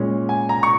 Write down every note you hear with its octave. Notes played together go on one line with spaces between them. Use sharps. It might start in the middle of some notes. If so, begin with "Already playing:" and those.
Already playing: A#2 G#3 C#4
G#5
A#5
C#6